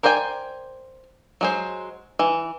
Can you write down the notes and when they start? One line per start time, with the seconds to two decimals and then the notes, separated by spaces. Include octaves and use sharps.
0.03 A#4 C5 D5 G5 G#5
1.41 F#3 G#3 C5
2.19 E3